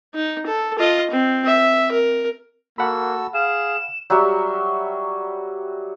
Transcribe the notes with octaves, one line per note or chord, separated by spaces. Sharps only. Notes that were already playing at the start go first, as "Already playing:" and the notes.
D#4
A4
F4 D#5
C4
E5
A#4
A#3 F#4 A4 F#5 B5 E6
G#4 F5 E7
F#3 G3 F#4 E5